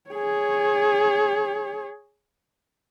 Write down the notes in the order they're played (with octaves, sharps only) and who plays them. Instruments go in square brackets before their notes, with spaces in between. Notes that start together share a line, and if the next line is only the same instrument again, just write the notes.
[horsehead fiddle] G#4 C#5